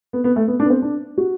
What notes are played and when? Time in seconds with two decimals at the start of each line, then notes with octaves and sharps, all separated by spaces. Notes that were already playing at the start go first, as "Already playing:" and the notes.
0.13 B3
0.24 B3
0.36 A3
0.48 B3
0.60 D4
0.65 B3
0.70 C4
0.82 D4
1.18 F#4